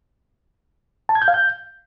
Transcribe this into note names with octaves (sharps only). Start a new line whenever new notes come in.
A5
G#6
G6
F5
G6